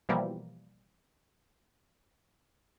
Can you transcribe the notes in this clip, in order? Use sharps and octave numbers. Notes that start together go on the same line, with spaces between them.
B2 E3 F3 G3 A#3